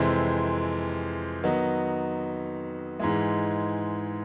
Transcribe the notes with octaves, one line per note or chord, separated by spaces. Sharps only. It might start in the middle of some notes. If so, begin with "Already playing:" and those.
Already playing: F2 C3 E3 G#3 C4
D#3 F#3 B3 D#4
G#2 E3 G#3